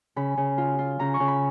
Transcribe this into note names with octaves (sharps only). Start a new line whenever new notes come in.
C#3 B5
C#3
F4
F4
C#3 A#5
C#6
C#3
B5